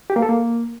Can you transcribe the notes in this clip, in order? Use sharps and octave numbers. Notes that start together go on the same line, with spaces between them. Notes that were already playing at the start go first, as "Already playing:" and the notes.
G4
A#3
A4
A#3